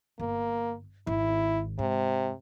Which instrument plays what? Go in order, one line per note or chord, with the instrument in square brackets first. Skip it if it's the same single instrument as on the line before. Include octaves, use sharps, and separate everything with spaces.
[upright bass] G1 [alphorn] A#3
[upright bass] G#1 [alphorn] E4
[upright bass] G#2 [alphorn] C3